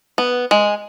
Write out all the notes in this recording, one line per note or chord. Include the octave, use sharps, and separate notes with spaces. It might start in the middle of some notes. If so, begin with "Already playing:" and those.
B3
G#3